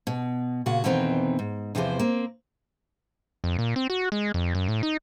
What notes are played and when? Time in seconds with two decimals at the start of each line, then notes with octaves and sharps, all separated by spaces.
0.07 B2
0.66 A#2 C#3 F#4
0.84 F2 B2 D#3 E3 C4 A#5
1.39 G#2
1.75 E2 C3 E3 F3 B4 C5
1.99 A#3 C4
3.44 F2
3.59 A#2
3.76 C4
3.90 F#4
4.12 G#3
4.34 F2
4.55 F#2
4.68 A2
4.83 D#4